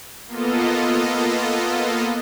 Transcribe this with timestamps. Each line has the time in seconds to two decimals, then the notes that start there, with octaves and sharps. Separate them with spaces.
0.26 A#3 B3 F4 A4 D#5